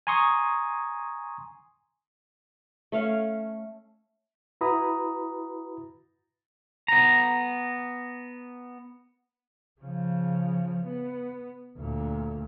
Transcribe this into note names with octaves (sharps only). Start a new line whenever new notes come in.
G#5 A#5 C6 C#6 D#6
A3 C#4 F5
E4 F#4 B4 A#5 B5 D#6
B3 A#5
C#3 F3
B3
D2 A#2